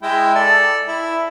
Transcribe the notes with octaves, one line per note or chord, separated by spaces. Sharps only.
G#3 E4 G5
A4 D5
E4